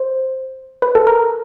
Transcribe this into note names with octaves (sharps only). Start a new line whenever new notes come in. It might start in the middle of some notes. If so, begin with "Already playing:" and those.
Already playing: C5
B4
A4
A#4